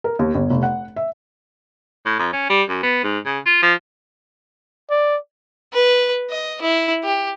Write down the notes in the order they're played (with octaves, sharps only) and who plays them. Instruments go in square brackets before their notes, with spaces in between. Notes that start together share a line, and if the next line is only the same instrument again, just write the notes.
[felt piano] A#4
D#2
G1
F1
F#5
E5
[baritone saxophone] A2
F2
C#4
G3
F#2
B3
G#2
C#3
F4
F3
[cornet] D5
[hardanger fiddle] B4
D#5
E4
G4